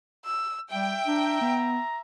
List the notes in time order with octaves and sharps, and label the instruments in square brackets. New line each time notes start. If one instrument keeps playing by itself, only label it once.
[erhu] E6
[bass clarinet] G3 [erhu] E5 [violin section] G5
[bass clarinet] D4 [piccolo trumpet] A#5
[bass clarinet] B3